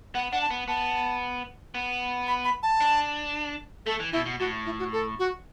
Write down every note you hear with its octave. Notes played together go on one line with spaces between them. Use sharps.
B3 F#5
D4 F#5
A5
B3
B3 A5
B3
B5
B5
A5
D4
A3 A4
E3
B2 E4
B2
A2 F#4
E4
F#4
A4
F#4